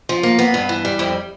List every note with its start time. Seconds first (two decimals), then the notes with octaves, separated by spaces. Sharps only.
0.09 F3
0.23 A#3
0.39 B3
0.54 G2
0.69 E3
0.85 G3
0.99 F2 E4